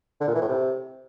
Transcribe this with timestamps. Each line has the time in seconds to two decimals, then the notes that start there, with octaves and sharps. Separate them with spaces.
0.21 D3
0.28 A#2
0.35 E3
0.42 A2
0.49 C3